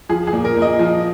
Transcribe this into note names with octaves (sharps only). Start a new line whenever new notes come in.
F3 G#4
G#4
A#2
A#4
A#2
D#5
F3